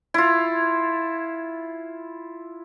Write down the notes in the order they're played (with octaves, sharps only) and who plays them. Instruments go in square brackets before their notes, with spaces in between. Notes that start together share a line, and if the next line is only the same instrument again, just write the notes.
[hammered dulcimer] E4 F4